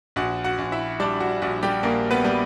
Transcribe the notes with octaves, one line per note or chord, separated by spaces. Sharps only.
A#1 F#4 F#5
F#4 F#5
A#1
E4 E5
G3 D4 D5
F#4
A#1 F#4
G3 G4
A#1 A#3 A#4
B3 B4
G3